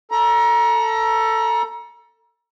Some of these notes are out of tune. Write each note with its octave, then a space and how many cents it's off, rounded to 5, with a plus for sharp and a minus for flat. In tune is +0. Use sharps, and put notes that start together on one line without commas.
A4 +15 A#5 +30